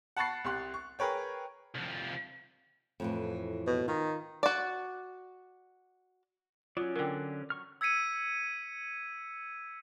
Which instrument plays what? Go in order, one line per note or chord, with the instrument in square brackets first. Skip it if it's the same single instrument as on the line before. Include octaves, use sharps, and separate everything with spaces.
[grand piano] F#5 A5 B5 C#6 A6 C7
C2 G4 C6 F#6
C#6
G#4 A#4 B4 C#5 G5
[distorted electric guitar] C2 F3
[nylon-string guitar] F2 A2 E3
[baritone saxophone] B2
[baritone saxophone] D#3 [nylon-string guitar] F4
[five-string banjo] F#4 D5
[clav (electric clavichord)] F#3 [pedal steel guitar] C#4 D5 [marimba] F4
[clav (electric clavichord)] D3 F#3 [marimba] A#4 G5
[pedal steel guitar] F#3 C#6 F6
[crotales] E6 G#6 B6 C#7 D#7